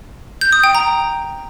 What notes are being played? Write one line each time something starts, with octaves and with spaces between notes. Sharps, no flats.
G6
D#6
G5
A#5